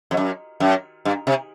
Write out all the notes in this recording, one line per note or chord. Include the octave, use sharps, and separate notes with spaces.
F2
F#2
F#2
G2
C3